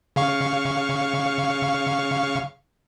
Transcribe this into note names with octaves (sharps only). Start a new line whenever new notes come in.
C#3 F5 C#6